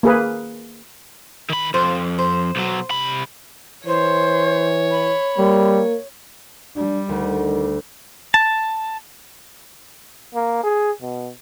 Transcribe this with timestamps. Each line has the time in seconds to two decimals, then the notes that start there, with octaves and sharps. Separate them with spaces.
0.03 A#3 G#4 B4
1.49 D#3 B5
1.74 F2 C5
2.18 C5
2.56 B1 F#3
2.91 C3 B5
3.86 E3 C5 C#5
4.91 B5
5.38 G3 A#3
6.76 G3 D4
7.09 D2 D#3
8.34 A5
10.34 A#3
10.63 G#4
11.01 B2